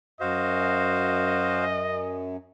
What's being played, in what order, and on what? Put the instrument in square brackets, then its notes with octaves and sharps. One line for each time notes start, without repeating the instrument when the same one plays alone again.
[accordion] F#2 [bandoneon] F#4 C5 F5 [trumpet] D#5